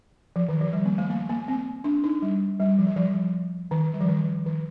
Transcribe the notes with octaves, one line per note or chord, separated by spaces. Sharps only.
F3
D#3
F3
G3
A#3
A3
A#3
A#3
C4
D4
D#4
G3
G3
F3
G3
F3
D#3
G3
F3
D#3
D#3